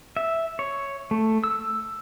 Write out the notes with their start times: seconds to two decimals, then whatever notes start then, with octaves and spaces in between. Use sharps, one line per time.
0.17 E5
0.59 C#5
1.11 A3
1.44 E6